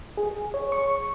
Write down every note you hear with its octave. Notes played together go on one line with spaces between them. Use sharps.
G#4
C#5
C#6